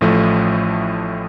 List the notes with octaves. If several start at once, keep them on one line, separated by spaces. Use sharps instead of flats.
A1 A2 F3 A3